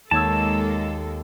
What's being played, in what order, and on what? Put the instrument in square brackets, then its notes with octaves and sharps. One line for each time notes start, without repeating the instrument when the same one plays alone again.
[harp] D#2 C#5 E6 [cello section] G#3 A#3 A4 [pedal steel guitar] A5